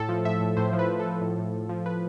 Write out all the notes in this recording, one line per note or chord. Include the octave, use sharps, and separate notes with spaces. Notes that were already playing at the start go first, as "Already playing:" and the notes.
Already playing: A2 A4
F3
A2 E5
A2
A2 C5
F3
B4
A2
A4
F3
A2
A2
A2
F3
F3 B4